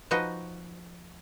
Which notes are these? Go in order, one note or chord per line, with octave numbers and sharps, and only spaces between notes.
F3 D#4 F#4 B4 D#5